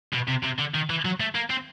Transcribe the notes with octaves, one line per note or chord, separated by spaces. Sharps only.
B2
C3
C3
D3
D#3
E3
F#3
A3
A#3
C4